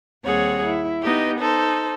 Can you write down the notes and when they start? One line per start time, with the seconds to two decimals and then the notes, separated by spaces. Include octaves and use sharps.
0.24 D#2 G3 C4 G#4 C#5 F#5
0.64 E4
1.04 B3 D#4 G4 D#5
1.38 D#4 A4 C5